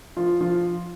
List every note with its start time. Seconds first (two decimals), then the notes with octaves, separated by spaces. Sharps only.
0.17 F3 F4
0.41 F3 F4